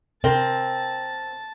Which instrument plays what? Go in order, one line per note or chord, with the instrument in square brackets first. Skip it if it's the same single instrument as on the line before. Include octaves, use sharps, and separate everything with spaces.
[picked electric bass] C3 [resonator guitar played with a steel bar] C4 [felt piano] A#4 [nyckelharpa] A5